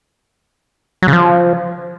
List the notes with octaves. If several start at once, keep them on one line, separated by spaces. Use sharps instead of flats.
F#3
C#3
F3